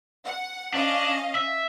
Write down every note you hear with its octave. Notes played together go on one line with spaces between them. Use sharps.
F#5
C#4 D4 D#5 F5
E5